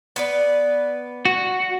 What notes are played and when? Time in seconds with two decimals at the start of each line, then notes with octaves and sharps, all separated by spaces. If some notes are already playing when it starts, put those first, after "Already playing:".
0.16 B3 B4 D5
1.25 F#4